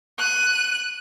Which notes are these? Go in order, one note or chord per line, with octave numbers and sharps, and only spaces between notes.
F#6 D#7